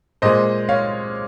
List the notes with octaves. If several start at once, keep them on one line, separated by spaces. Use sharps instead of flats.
A#2 G#3 C5 D#5
C#5 F5